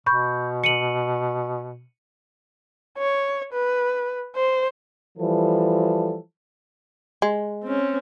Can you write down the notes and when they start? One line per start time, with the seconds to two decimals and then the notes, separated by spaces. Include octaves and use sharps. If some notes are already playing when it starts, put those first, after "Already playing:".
0.06 B2 B5 C#6 G6
0.64 C#7 D#7 F#7
2.98 C#5
3.53 B4
4.36 C5
5.18 E3 F3 G3 A4
7.22 G#3
7.64 C4 C#4